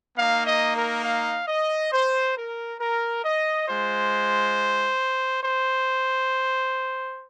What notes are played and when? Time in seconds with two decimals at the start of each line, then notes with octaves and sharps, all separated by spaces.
0.17 A#3 D#4 F5
0.46 D#5
0.76 A#4
1.04 F5
1.48 D#5
1.92 C5
2.37 A#4
2.80 A#4
3.24 D#5
3.68 G#3 F4 C5
5.43 C5